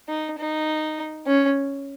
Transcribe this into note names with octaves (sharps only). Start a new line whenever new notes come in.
D#4
D#4
C#4